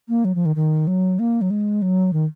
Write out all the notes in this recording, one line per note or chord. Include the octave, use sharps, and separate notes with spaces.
A#3
F#3
F3
D#3
D#3
F#3
A#3
F#3
G#3
F#3
D#3